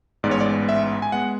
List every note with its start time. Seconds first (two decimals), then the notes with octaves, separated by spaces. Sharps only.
0.23 A1 G#2 G#3 B3 D5
0.31 C#5
0.41 D5
0.69 E5
1.02 G#5
1.12 G#3 B3 F#5